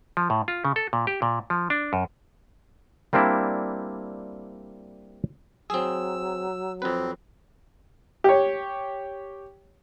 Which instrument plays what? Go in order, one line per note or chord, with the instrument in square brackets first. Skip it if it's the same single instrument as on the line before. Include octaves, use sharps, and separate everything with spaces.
[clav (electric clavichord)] F3
A2
F4
C#3
A4
A#2
G4
A#2
F3
D4
F#2
G3 A#3 C4 D4 E4
[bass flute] F#3 [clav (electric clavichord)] C4 G#4 [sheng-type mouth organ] E6
[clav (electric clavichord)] F2 B4 [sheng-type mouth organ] C4
[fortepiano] G4 C#5